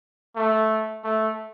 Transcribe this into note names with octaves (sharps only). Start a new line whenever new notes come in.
A3
A3